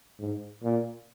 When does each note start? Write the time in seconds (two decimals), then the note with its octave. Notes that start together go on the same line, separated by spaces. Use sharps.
0.19 G#2
0.63 A#2